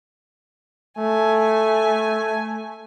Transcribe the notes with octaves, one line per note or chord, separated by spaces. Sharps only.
A3 G#5